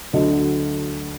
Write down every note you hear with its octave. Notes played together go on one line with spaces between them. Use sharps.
D2 D3 F#3 A3 D#5